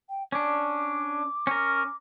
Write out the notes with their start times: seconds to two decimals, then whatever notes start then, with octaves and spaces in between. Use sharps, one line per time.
0.09 G5
0.32 C#4 D4 D6
1.47 C#4 A#4